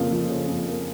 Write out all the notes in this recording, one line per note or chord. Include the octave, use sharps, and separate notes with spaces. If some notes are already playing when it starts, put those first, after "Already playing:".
Already playing: F2 C#3 F3 A#3 F5
F3
C#3
F2
A#3